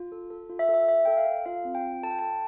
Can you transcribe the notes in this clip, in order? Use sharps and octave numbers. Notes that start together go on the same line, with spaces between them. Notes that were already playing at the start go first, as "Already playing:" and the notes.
Already playing: F4
A4
A4
F4
E5
A4
E5
A4 E5
A4 G5
F5
A4
F4 F5
C4
G5
F4
A4 A5
G5
A4 A5